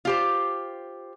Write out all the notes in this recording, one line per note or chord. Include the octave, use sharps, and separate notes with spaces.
F4 G4 C5